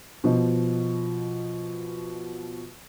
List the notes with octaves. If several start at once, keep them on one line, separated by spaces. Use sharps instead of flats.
B2 F3 D#5